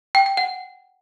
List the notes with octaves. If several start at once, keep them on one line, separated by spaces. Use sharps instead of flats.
G5
G5
F#5